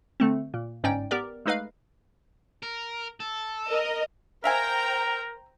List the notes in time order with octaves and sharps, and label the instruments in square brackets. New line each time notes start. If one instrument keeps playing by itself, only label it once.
[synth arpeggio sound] D3 A3 C4
A#2
G1 G#2 C#4 D#4 D5 G5
B3 G4 A#4 D5
G#3 A3 D#4 B4 D#5 F5
[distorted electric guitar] A#4
A4
[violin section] A#4 D#5
[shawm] A#4 [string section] C5 G5 A#5 [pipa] E5 F5 G#5